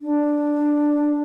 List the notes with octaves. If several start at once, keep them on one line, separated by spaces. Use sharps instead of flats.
D4